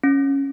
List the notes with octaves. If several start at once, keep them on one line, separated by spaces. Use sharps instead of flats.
C#4